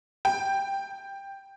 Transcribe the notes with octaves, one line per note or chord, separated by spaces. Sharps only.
G5